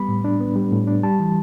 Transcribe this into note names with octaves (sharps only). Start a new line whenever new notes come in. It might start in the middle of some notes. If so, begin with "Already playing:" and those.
Already playing: G3 B3 B5
A2
D4
B3
G3
A2
D4
G3 A5
E3